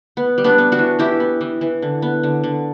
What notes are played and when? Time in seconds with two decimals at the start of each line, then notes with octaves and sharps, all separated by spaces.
0.17 B3
0.38 G3
0.44 B3 D4
0.58 B3
0.72 D4 F#4
0.78 E3
0.99 E3 E4 G4
1.20 B3
1.41 E3
1.61 E3
1.82 D3
2.02 B3
2.23 D3
2.44 D3